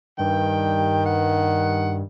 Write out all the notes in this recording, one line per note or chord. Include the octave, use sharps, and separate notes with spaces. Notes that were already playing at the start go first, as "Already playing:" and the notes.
G2 D#3 G5
F#5